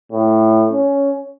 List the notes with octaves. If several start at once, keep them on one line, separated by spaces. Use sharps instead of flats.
A2
C#4